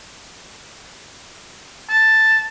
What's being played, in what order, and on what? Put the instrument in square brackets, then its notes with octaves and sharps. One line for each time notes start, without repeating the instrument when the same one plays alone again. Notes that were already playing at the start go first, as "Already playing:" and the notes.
[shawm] A5